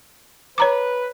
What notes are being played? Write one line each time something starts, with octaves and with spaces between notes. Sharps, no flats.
B4 C#5 A#5 D6